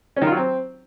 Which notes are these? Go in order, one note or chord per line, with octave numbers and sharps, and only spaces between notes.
C#4
D#3
F4
F#3
C4